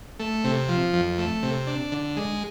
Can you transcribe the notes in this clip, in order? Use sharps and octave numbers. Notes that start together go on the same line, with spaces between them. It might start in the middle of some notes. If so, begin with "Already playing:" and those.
A3
C3
F3
F2
A3
C3
D4
D3
G#3